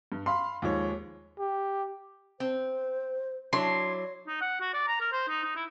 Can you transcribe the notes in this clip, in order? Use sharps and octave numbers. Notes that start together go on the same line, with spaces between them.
G2
F5 B5 C6
D#2 F3 G#3 C#5
G4
C4 C5
F#3 D4 E4 C#5 C6
D#4
F#5
F#4
D5
A#5
A#4
C5
D#4
D#4
E4